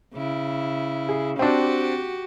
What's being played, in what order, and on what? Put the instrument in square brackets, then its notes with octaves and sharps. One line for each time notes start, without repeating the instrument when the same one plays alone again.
[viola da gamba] C#3 E4
[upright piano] G#4
[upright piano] C4 D4 [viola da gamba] F#4 G4